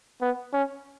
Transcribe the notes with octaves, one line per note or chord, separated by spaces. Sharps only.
B3
C#4